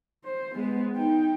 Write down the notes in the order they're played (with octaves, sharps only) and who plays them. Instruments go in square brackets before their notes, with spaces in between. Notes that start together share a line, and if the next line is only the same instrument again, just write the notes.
[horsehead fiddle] C5
G#3 B3
D#4 G5